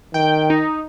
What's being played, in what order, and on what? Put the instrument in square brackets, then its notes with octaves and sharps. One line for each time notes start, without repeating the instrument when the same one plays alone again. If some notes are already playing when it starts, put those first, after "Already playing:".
[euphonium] D#3 [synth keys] G5
[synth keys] D#4